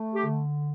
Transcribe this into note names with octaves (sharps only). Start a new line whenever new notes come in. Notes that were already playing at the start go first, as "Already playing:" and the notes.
Already playing: A3
G4
D3